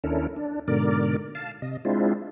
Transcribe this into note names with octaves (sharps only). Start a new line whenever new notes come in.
D#2 C#4 D4 E4 A4 A#4
D4
G#2 B2 D3 A#4 D5
F5 A5
C3 D#5
G#3 C4 D4 E4 F4